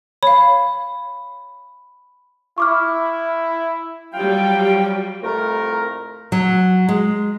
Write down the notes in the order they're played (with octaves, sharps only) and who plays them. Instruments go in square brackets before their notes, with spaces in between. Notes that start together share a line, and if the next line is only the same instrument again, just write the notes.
[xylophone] C#5 F5 [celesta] B5
[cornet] E4 [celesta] C#6 D6 F6
[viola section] F#3 G3 [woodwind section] F4 F5 G5
[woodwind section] C2 F2 A3 A#4
[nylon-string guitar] F#3
G#3